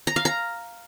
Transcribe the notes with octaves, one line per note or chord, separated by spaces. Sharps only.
A#5
F5
A#5